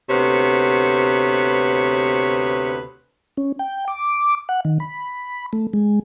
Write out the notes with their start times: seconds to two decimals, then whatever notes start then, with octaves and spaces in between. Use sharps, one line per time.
0.10 D2 C3 B3 B4 C#5
3.37 C#4
3.59 G5
3.88 D6
4.49 F#5
4.65 D#3
4.80 B5
5.53 A3
5.74 G#3